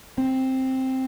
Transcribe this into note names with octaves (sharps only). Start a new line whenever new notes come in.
C4